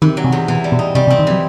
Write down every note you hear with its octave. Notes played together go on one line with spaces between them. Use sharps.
C3 D#3
F#3
C3
E2
B2 E3
G3
B2
D#4
C3 G3
C3
C4
D#3
E3 F#3